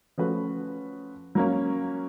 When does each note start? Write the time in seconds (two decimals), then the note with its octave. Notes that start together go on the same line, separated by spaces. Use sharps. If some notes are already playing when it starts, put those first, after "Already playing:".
0.18 F3 A3 C#4 F#4 B4
1.35 F#3 A#3 C#4